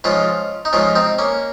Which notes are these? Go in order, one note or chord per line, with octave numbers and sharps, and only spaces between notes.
G#2 F3 G#3 C#4 F4
D#4
G#2 F3 G#3 C#4 F4
C4 D#4
A#3 C#4